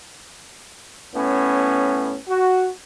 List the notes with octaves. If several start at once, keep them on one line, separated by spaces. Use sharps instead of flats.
A2 B3 C#4
F#4